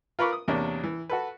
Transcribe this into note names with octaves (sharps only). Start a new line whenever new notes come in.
F4 A#4 B4 B5 C#6 D6
D#6
E2 C3 A#3 C#4 D4
E3
F#4 A4 B4